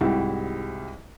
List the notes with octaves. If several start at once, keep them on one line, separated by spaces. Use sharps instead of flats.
C2 G#2 E4 F#4 G4